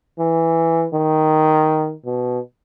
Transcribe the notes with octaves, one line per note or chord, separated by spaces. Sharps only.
E3
D#3
B2